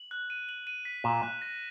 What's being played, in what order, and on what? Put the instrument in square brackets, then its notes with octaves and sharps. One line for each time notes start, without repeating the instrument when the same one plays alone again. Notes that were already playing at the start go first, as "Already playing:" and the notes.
Already playing: [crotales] F#7
F#6
D#7
F#7
D#7
B6
[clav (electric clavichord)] A#2 [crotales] E7
[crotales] F#6
A#6